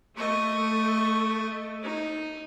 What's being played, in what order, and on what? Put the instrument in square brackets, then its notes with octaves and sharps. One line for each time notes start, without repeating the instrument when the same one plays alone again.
[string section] A3 [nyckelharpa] D#5 C#6
[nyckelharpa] D#4